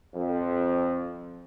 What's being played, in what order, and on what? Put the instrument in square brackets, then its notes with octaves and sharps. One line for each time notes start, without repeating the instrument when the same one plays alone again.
[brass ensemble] F2